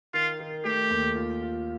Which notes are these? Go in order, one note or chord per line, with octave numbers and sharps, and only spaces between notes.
D#3 F4
D#3
A3 G4
D#2
F4
F4